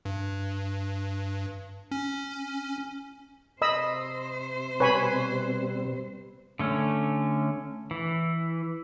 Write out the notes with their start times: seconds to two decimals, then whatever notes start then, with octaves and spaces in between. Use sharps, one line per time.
0.05 G2
1.92 C#4
3.62 C3 C5 D#5 B5 E6
4.80 B2 G3 C4 B4 C#5 G#5 B5
6.59 D3 A3 C#4
7.91 E3